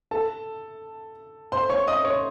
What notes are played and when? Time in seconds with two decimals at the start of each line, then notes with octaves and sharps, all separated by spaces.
0.11 A4 A5
1.52 C5 C6
1.69 C#5 C#6
1.87 D#5 D#6
2.05 C#5 C#6